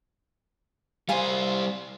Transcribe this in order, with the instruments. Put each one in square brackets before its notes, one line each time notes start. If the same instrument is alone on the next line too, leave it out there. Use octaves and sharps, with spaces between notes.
[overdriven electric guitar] G3 C5 [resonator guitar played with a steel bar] F5 G#5